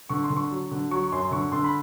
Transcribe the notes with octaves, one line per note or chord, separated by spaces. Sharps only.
D3 C#6
C6
D3
C#6
F#3
D3
F#3 C#6
C#6
F#2 C6
D3 C#6
D3 C6
B5